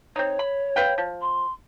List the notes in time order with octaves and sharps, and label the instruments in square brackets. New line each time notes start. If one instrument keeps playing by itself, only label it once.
[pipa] C4 D#4 [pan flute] C#5
[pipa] B5
B4 F5 G5
F3
[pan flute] C6